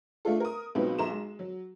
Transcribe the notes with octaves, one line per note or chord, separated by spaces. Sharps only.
A3 D4 F4 A4
A#4 D#6
C#2 B2 F#3 C4 D#4 B4
B1 A#5 C6 E7
G#3
F#3